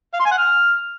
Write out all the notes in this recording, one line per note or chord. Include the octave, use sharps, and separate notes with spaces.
F5
C6
G#5
F#5
F6